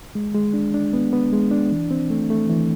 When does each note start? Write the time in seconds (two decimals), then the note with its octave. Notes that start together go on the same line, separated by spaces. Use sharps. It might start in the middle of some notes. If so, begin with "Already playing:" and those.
0.15 G#3
0.34 G#3
0.54 D4
0.74 D4
0.93 B3
1.13 B3
1.33 G#3
1.51 D4
1.72 E3
1.91 C4
2.10 A3
2.30 A3
2.50 E3